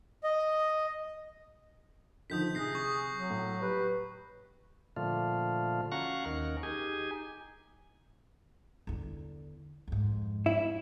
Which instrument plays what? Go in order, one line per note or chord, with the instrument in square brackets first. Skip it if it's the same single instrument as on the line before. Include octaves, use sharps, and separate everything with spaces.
[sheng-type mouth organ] D#5
[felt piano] D3 D#3 F3 [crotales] D#6 G6 B6
[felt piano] C3 [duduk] G#4 [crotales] F#6 A#6 C7
[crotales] C#6
[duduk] F#3
[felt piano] A2
[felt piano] G4 [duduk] B4
[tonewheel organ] A#2 D3 F3 A3 F4
C#4 F#4 F5 F#5 A#5 C#6
D#2 D#3 C#4 A#4
D#4 G4 G#4 G#5
[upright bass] E2 D3
F2 G#2
[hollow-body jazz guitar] E4